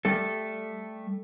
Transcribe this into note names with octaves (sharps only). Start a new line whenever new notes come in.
G3 A3 A4